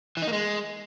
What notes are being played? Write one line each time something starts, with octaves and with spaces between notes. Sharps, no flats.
E3
D#4
A#3
G#3